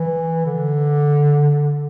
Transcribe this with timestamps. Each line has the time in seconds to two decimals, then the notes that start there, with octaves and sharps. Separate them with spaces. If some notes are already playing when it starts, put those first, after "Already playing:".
Already playing: E3
0.46 D3